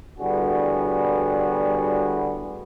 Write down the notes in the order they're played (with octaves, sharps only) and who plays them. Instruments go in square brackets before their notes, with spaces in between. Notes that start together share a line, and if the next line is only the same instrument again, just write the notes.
[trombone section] A2 D3 G3 B3 F#4 G#4